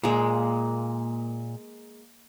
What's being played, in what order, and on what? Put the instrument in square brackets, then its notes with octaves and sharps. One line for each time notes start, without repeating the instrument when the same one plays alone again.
[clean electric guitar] A#2 [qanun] G#3 A#3